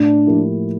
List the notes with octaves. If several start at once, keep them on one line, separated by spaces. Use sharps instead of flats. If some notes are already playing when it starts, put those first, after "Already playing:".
Already playing: A2 D4
F3 A#3 E4 G4